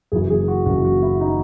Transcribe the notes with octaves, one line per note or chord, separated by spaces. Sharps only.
F#1 F#2 E3 G#4
G#4
F#4
F#1 F#2 E3 F#4
F#4
E4
E3 D#4